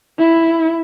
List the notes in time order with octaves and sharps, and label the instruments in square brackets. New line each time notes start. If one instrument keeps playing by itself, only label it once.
[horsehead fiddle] E4